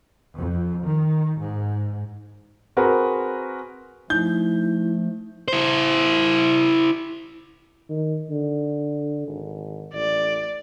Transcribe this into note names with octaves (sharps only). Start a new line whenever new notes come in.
F2
D#3
G#2
C4 F#4 G#4 A#4 B4
F3 A3 D#4 E4 G6
E4 C5
D#3
D3
G#1
A1 D5